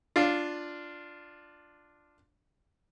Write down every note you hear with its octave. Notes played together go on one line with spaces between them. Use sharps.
D4 F4